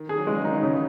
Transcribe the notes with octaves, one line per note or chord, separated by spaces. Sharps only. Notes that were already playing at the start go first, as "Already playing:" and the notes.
Already playing: D#3
G#4
F#3
C#3 E3 G#3
D#3 F#3 D#4
C#3